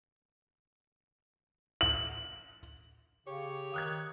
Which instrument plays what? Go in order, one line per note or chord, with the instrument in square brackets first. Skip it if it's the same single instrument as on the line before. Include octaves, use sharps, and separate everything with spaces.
[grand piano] F#7
[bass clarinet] C#3 [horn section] G4 C#5
[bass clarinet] D#3 [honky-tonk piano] D#6 F#6 G#6